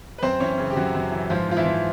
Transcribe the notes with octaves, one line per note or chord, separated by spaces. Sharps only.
B4
F#2 C4 C5
E3 C#4 C#5
C#3
G4
F#2 F#3 F#4
F#2
E3
G#2 F3 F4
G#2 F4
E3 E4
F3